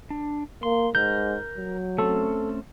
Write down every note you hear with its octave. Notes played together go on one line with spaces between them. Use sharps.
D4
A#3 C6
G#2 A#4 G6
F#3
A3 C4 C#4 A4